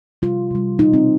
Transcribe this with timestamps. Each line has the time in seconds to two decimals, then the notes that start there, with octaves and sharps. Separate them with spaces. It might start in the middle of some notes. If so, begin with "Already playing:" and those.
0.22 C3 G3 F4
0.51 C3 G3
0.78 B2 G3 D#4
0.93 C4